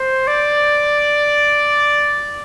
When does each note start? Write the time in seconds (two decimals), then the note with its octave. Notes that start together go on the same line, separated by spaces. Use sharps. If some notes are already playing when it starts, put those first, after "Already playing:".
Already playing: C5
0.27 D5